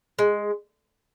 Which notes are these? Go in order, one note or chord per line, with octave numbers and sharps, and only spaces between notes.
G#3